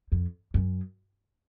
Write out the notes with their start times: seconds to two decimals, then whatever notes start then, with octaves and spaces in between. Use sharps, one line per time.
0.12 F2
0.54 F#2